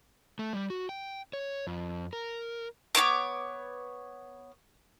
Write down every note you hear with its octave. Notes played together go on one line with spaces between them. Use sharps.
A3
G3
F#4
G5
C#5
F2
A#4
B3 D#4 C#5 D6